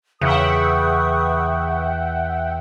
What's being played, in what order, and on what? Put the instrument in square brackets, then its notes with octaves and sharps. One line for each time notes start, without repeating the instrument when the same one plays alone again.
[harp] E2 [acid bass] C#3 [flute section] B4 C#6 D#6 [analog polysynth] E5 F#5 G5